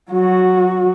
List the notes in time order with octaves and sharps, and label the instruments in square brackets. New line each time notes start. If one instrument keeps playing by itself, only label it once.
[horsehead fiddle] F#3 F#4